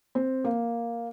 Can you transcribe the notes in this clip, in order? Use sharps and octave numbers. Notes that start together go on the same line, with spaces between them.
C4
A#3